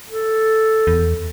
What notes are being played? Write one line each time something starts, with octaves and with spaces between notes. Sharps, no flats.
A4
E2